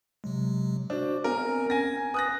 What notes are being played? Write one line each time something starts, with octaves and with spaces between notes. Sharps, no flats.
C3 F#3 G#3
D4 F#4 C5
B3 C4 A#4 G#5
C#4 G#5 A#6
B4 D#6 F#6 A#6